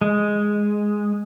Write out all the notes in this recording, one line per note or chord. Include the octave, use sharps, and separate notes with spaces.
G#3